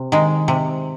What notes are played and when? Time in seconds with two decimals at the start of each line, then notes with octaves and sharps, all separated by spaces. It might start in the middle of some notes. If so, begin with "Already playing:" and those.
Already playing: C3
0.12 D#3 G#3
0.48 C3